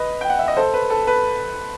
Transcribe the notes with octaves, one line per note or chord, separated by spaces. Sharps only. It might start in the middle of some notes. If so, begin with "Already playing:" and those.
Already playing: B4 D#5
G5
F#5
E5
D#5
A4 C5
B4
A4
B4